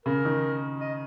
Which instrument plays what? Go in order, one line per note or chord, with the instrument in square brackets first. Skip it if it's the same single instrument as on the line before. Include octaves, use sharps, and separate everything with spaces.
[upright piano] C#3 [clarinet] A#4
[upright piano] D#3
[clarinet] D#5